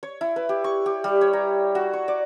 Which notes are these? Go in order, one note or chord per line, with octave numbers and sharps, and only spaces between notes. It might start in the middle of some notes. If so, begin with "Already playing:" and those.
C#5
E4
B4
G4
C#6
G4
G3
C#5
A#5
F#4
C#6
D5